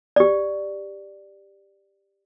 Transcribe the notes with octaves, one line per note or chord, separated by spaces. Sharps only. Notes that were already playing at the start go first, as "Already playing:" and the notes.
G4 D5